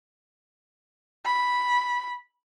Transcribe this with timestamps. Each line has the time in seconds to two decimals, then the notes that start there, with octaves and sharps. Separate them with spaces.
1.26 B5